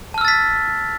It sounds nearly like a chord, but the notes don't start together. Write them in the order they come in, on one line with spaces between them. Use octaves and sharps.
A5 F6 E6 A6 B6